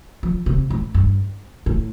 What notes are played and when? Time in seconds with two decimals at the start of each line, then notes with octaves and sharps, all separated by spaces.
0.23 F3
0.46 C3
0.70 A2
0.94 G2
1.66 A2